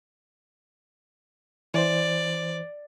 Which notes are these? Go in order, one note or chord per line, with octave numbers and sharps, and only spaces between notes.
E3 C5 D5